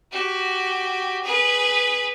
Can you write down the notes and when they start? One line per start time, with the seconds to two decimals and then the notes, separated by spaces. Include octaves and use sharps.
0.12 F#4 G4
1.23 G#4 B4